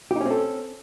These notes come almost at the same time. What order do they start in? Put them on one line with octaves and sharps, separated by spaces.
G4 D#4 C#4 C4 A4